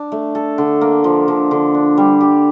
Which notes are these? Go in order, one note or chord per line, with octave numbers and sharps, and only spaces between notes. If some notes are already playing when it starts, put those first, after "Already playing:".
Already playing: D4
A3
A4
D3
A#3
F3
D3
D3
D4
G3
G4